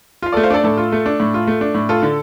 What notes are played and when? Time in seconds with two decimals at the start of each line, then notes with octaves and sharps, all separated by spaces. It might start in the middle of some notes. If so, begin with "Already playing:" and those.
0.22 F4 F5
0.32 A4 D5
0.37 A3
0.43 C5 F5
0.51 D4 A4 D5
0.64 A2 A4
0.78 F4
0.92 A3
1.06 D4
1.20 A2
1.34 F4
1.47 A3
1.61 D4
1.75 A2
1.89 F4 A4
2.03 D3